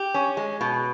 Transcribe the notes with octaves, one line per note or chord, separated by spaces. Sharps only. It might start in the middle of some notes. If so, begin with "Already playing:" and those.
Already playing: G4
C#4
G#3
B2